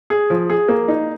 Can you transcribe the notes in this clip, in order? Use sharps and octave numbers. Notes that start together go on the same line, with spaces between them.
G#4
F3
G#4
A#3
D#4